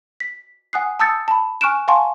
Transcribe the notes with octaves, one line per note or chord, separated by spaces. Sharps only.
B6
F#5 G#5 D#6 F#6 C7
A5 D#6 E6 G6 A6 C#7
A5 B5
G#5 C#6 F6 F#6 D7 E7
F5 F#5 G#5 A5 C6 C#6